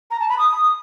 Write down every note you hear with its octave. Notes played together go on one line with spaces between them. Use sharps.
A#5
A5
B5
D#6